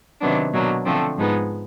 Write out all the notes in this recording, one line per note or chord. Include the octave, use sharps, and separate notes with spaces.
C3 D#3 F#3 B3 D4
B2 F#3 A#3 D4
D3 F3 A3 C4
G#2 F3 G#3 B3 D#4